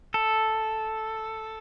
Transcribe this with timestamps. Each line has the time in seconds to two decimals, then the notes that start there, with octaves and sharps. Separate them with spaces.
0.14 A4